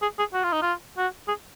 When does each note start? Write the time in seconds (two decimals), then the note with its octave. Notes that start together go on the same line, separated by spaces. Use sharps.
0.02 G#4
0.19 G#4
0.34 F#4
0.44 F4
0.53 D#4
0.62 F4
0.98 F#4
1.28 G#4